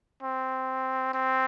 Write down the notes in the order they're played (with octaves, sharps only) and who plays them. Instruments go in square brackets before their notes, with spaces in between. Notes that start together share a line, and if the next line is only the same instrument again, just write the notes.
[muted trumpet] C4
C4